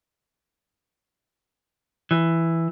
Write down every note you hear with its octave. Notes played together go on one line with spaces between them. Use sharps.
E3